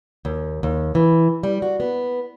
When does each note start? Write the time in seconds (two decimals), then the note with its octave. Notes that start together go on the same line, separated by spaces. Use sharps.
0.25 D#2
0.63 D#2
0.95 E3
1.43 G3
1.62 F#4
1.80 B3